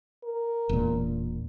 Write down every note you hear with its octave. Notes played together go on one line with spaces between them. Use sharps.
A#4
E1 A#2